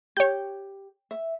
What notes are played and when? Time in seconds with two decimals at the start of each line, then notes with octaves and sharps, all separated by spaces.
0.17 G4 C#5 G6
1.11 E5